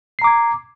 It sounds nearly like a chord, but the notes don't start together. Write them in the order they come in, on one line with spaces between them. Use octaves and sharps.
C7 A#5 D6 G#6